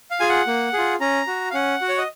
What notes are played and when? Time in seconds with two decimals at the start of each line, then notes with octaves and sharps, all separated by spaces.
0.11 F5
0.20 F4 G#4 G#5
0.29 F#5
0.47 A#3
0.73 F4 G#4
1.00 C#4 A#5
1.27 F#4
1.51 F5
1.54 C#4 F#5
1.81 F#4
1.89 C#5
1.98 D#5